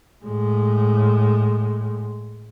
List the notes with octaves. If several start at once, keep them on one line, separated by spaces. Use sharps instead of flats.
A2 G#3